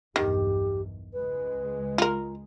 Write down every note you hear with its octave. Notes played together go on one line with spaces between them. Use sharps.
B1 E2 G2 D#3 G4
C#2 G#3 B4
F4 A#4